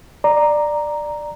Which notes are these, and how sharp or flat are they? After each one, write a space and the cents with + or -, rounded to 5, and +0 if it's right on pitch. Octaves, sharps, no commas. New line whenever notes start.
D5 +15 A#5 +0